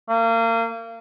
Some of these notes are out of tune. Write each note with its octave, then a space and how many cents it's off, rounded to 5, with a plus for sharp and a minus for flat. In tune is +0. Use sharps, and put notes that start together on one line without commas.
A#3 -30